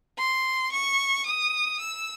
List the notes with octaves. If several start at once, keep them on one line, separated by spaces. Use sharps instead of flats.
C6
C#6
D#6
E6